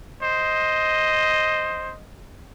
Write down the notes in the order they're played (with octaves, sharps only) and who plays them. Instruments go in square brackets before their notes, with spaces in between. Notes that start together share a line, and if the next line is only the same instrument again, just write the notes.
[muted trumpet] C5 [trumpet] D#5